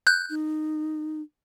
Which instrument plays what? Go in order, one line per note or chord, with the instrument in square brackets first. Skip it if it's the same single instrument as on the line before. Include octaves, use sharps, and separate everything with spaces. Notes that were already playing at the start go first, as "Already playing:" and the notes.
[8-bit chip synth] F#6 G6
[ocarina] D#4